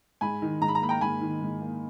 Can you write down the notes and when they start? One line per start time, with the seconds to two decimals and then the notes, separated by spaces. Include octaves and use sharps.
0.21 G#2 G#5 B5
0.42 D#3
0.61 G#2 A#5
0.68 B5
0.75 A#5
0.82 A#3 B5
0.89 G5 A#5
1.01 G#2 G#5 B5
1.21 D#3
1.41 G#2
1.61 A#3